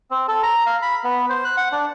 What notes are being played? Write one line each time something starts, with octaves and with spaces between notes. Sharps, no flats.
C4
A4
A#5
F5
B5
B3
C5
F#6
F#5
D4